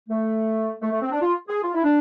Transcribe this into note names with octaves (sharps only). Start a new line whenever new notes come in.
A3
A3
A3
C4
D4
F4
G#4
F4
E4
D4